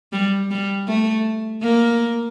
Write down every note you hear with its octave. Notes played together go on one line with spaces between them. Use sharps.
G3
G3
A3
A#3